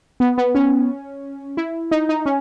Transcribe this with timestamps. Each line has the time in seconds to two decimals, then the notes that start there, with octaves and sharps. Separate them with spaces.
0.20 B3
0.38 B3
0.55 C#4
1.57 E4
1.91 D#4
2.09 D#4
2.26 C#4